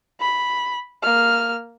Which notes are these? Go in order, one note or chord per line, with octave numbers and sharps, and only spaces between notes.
B5
A#3 F6